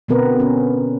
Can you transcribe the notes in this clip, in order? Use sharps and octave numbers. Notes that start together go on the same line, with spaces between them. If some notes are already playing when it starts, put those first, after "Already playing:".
B2 D3 B3 C4 A#4 B4
C#4